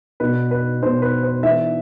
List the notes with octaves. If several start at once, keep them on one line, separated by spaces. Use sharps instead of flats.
B2 B3 D4 B4
B4
B2 B3 D4 C5
B4
C5
E3 B3 D4 E5